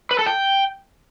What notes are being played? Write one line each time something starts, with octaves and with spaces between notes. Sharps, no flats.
B4
A4
G5